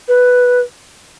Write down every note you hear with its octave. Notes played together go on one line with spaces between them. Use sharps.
B4